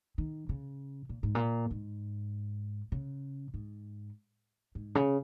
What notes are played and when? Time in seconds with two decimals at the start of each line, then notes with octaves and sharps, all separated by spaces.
0.18 D#3
0.49 C#3
1.09 A#2
1.23 G#2
1.35 A#2
1.71 G#2
2.92 C#3
3.54 G#2
4.75 G#2
4.95 C#3